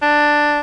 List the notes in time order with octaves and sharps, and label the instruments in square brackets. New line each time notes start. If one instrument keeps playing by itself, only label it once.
[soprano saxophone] D4